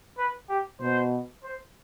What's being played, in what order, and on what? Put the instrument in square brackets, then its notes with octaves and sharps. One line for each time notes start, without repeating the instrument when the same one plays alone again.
[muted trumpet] B4
G4
[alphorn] B2 [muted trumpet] C5
[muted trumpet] C5